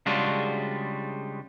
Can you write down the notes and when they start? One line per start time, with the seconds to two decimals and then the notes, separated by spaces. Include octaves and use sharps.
0.06 C#3 G3 G#3 D4 F4 F#4